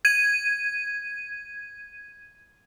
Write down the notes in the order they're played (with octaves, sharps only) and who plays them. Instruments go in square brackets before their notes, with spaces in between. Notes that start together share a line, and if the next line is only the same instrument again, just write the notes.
[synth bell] G#6 D#7